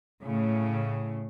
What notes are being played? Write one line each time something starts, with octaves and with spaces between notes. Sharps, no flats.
A2 C#3